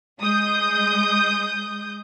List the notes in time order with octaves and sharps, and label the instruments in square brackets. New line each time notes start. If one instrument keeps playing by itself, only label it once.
[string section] G#3 D#6 G6